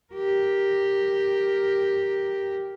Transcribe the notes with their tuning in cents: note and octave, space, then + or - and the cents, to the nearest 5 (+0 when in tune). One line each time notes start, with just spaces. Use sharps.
G4 +0 A#4 +0